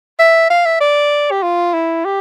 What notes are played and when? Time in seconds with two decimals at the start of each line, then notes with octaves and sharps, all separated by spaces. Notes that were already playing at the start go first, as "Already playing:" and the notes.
0.19 E5
0.50 F5
0.66 E5
0.81 D5
1.31 G4
1.43 F4
1.74 E4
2.05 G4